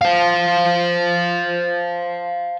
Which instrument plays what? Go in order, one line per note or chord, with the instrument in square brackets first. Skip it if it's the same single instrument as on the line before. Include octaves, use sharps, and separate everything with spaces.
[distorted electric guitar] C5 F5